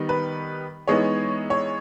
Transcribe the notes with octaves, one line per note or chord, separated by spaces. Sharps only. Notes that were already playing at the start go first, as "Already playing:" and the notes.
Already playing: D#3 G3 B3 D#4
B4
E3 G#3 B3 D#4 C#5
C#5